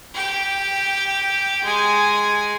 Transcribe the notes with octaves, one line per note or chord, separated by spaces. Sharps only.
G4 G5
G#3 G#5